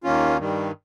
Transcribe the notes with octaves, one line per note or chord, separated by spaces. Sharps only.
D#2 D#3 A#3 C#4 F4
G2 D#3 G3